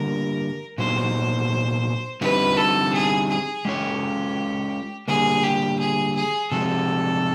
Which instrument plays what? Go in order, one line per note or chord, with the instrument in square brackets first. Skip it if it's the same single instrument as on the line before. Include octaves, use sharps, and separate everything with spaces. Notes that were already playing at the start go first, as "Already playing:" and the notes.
Already playing: [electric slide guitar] D3 G3 A#3 [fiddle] A#4
[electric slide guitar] A#2 F#3 B3 D#4 [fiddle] C5
[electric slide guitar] D3 G3 C4 D#4 [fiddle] B4
[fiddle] A4
G#4
G#4
[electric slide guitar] G#3 C#4 F4 A4 C#5 [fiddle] G4
[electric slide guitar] D3 G3 A#3 [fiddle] G#4
[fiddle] G4
G#4
G#4
[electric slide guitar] C3 F3 G#3 [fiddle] A4